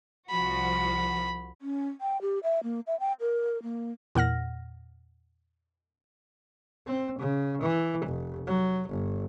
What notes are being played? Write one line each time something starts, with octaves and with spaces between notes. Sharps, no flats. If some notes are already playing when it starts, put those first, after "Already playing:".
C2 F3 F#4 B5
C#4
G5
G4
E5
A#3
E5
G5
A#4
A#3
E2 A#2 F#5 F6 A#6
C4
C#3
E3
F1
F#3
G1